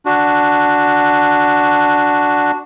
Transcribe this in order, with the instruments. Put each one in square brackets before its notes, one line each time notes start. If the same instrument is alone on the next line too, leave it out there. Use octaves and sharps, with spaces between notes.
[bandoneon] D4 F#4